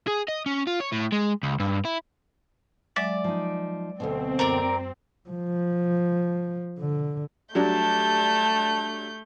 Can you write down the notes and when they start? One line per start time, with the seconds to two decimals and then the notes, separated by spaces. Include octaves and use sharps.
0.08 G#4
0.28 D#5
0.46 C#4
0.67 F4
0.80 C#5
0.92 A2
1.12 G#3
1.43 C#2
1.60 G2
1.85 E4
2.96 F#3 G#3 D5 E5
3.24 F3 D#4
4.00 D2 G2 B2 C4
4.39 F#2 A#4 D5
5.29 F3
6.79 D3
7.55 F#3 G3 A3 D4 A5 G6